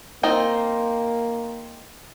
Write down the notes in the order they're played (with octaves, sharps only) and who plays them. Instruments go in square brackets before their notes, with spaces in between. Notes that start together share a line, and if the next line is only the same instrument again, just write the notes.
[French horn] A#3 [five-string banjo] C4 D#4 F4